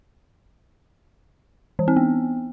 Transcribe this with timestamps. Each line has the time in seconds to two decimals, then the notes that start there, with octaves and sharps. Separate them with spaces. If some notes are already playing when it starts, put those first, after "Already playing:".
1.79 E3
1.88 C4
1.96 B3